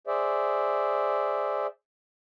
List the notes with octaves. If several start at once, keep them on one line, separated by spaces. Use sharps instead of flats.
G#4 C5 D5 E5